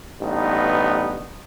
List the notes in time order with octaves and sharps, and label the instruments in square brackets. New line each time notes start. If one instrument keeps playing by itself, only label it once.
[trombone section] A1 G2 B3 D#4